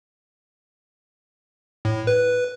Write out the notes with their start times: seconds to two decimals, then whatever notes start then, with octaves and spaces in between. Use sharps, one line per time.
1.85 A2
2.07 B4